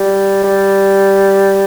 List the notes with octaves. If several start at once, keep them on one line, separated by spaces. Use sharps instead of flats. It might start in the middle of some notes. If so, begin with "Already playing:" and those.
Already playing: G3
G3